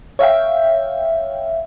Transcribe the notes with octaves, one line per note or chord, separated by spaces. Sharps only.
C#5 E5 F5 G5